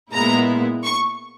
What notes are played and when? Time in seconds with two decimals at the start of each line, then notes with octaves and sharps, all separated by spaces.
0.12 A#2 G#3 B3 E4 A#5
0.83 C#6